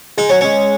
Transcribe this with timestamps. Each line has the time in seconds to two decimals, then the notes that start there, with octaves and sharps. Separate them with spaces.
0.17 G#3 D#4
0.29 F#3 C#4
0.41 G#3 C#4